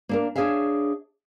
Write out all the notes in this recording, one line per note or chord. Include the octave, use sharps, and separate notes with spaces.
A#3 D4 A#4
D4 D#4 G#4 C#5 E5 F5